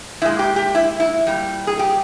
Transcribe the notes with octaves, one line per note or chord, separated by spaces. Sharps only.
A#2 G#3 E4
G4
G4
E4
E4
A#2 G3
G#4
G4